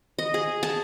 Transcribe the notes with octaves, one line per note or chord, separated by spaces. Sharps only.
D#5
G#4
A5